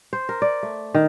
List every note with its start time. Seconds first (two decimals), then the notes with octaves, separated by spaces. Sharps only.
0.13 C5
0.29 A#4
0.42 D5
0.63 A3
0.94 D#3